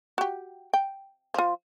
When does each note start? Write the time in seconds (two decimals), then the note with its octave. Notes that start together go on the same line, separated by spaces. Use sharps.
0.18 F#4 G4
0.73 G5
1.34 F3 F4